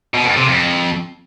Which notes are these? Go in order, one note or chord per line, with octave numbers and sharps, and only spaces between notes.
B2
F2
C3
F2